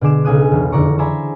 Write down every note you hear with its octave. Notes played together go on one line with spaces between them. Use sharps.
B2 D3 G#4 D6 E7
B1 C#3 G#5 D#6 F#6
E1 G3
F1 D3 E4 D5 A#5 C#6
C5 D5 E5 G#5 A#5 B5